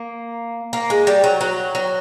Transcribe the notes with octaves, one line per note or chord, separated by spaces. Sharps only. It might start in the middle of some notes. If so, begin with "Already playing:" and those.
Already playing: A#3
A#3
G#3
G3
F#3
F#3
F#3